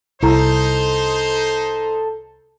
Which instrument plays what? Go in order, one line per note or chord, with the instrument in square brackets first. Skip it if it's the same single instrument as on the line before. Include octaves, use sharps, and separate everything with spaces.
[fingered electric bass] C2 [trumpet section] D#4 C5 [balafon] E4 A#5 [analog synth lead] A4